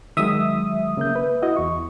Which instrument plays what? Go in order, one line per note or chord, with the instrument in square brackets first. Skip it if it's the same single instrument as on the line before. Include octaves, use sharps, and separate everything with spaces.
[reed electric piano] D#3 F#3 G#3 [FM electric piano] E5 D#6
[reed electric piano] C#3 A#3 G6
B4
E4 F#4 D#5
E2 C#6